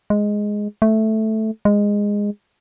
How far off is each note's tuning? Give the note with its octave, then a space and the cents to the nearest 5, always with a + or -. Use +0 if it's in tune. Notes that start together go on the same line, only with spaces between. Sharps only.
G#3 +0
A3 -5
G#3 -15